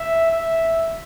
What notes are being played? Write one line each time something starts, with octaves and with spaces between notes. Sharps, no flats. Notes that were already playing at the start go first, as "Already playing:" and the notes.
Already playing: E5
E5